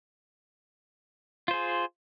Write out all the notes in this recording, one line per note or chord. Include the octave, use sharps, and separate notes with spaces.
F4 G#4 C5